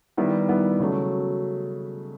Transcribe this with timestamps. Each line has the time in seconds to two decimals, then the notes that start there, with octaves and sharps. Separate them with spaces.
0.17 D#3 G3 B3 E4
0.48 D#3 G3 B3 E4
0.80 C#3 F#3 A3